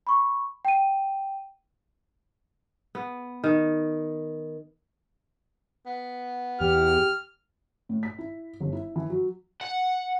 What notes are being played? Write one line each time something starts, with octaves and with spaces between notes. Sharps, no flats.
B5 C#6
G5 D#7
B3
D#3
B3
E2 G4 F6
A2
B6
E4
G1
E4
E3
F#3
F#5